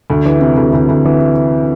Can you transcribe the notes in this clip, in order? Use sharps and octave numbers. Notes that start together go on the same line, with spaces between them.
D2
E3
C3
D2
D2
D2
E3